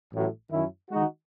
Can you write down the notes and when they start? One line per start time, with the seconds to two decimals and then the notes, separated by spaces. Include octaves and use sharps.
0.13 A1 A2 F#3
0.50 F#2 D#3 F#3 C#4 E4
0.90 D#3 G#3 D#4 F#4